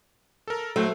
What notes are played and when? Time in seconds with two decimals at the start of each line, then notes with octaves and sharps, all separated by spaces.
0.48 A4 A#4
0.76 F#3 A3 C5